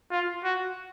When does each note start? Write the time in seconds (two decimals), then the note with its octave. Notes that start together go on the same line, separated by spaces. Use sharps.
0.11 F4
0.44 F#4